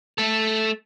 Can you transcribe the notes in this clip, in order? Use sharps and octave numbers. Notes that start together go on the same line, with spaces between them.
A3 A4